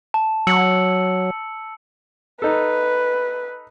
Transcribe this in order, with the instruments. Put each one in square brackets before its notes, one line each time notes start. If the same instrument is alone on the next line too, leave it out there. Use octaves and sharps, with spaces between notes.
[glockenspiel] A5
[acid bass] F#3 [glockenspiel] E6 C#7 F#7
[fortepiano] D#4 A4 [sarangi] B4